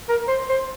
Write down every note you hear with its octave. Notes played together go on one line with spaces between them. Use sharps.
A#4
C5
C5